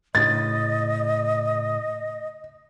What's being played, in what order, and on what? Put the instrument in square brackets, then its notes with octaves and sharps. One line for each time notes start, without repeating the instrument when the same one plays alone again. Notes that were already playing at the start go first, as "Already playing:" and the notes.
[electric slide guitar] A2 C#3 [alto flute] D#5 [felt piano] A6